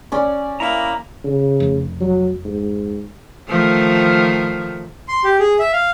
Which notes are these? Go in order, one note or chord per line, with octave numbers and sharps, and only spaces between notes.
C#4 D5
A#3 E4 A#5
C#3
F1
F#3
G#2
D#3 F3 A3
C6
G4
G#4
E5
F5